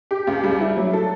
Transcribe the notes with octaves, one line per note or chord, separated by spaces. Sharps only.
G4
C#2
G3
E4
F#3
A4